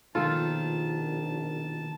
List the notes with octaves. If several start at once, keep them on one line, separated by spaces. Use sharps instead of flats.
A#1 B2 D#3 F4 A4 A5